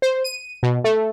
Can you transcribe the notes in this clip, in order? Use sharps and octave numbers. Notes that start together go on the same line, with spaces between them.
C5
D#7
B2
A3